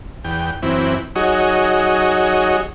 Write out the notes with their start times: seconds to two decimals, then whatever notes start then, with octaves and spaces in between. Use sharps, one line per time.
0.24 E2 G5
0.63 F#2 E3 C4 E4
1.16 F#3 D#4 F#4 G#4 C#5 D#5